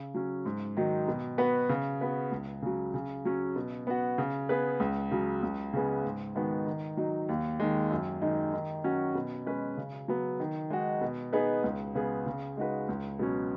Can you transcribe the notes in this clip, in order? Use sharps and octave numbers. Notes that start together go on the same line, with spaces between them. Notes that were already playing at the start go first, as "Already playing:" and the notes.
Already playing: C#3
F#3 C#4
G#2
D#3 F#3 D#4
B2
B3 F#4 B4
C#3
B3 F#4 B4
C#2
C#3 F#3
C#3
F#3 C#4
B2
B3 F#4
C#3
B3 G#4 B4
C#2
C#3 F#3
C#2
C#3 G#3 B3 G#4
G#2
D#3 G#3 B3 F#4
D#3
F#3 D#4
D#2
D#3 G#3
F#2
D#3 G#3 D#4
D#3
F#3 C#4 F#4
B2
G#3 C#4 B4
C#3
F#3 B3
D#3
G#3 D#4 F#4
B2
B3 D#4 G#4 B4
C#2
C#3 B3 G#4
C#3
G#3 D#4 F#4 B4
C#2
B2 F#3 C#4